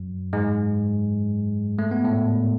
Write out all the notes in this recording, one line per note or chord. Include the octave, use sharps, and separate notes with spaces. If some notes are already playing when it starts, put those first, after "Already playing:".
Already playing: F#2 F#3
G#2 G#3
A3
B3
A2 A3